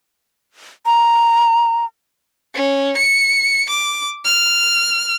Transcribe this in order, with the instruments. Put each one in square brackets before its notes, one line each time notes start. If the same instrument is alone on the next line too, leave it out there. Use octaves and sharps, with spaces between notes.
[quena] A#5
[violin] C#4
C#7
D6
F6